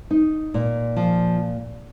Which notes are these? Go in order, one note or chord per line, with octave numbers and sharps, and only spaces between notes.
D#4
A#2
F3